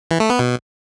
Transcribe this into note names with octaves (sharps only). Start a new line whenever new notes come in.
E3
A3
B3
B2